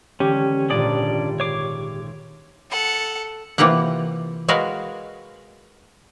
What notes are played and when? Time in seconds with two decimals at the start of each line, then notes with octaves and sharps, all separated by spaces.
0.20 D3 E3 G#3 C#4 G4
0.70 G#1 A#2 C#4 D4 D5 D#6
1.40 C#5 D6 C7
2.71 A4 F#5
3.58 C3 E3 A#3 F4 G4 F#5
4.48 G#3 F#4 A#4 B4 F5